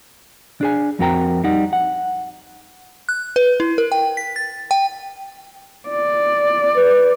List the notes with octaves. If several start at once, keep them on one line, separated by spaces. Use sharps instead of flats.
D4 G#4 G#5
F2 C4 F#4 A#4 G5 A#5
G3 D#4 F#5
F#5
F#6
B4
E4
A#4
G5
B6
A6
G5
D5
B4